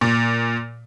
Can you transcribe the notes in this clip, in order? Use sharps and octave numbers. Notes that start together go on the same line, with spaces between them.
A#2